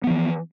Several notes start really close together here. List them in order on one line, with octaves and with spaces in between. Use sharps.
B3 F3 E3